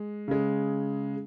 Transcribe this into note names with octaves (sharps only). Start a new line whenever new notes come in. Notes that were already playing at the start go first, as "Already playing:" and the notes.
Already playing: G#3
C#3 G#3